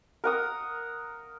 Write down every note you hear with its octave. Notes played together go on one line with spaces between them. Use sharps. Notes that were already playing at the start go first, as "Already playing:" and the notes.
A#4 F#5 D#6